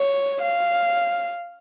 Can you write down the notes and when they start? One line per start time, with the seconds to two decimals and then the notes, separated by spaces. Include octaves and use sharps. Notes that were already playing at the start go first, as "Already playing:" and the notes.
Already playing: C#5
0.42 F5